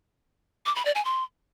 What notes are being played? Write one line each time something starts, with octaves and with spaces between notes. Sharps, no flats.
D6
B5
D5
G#5
C6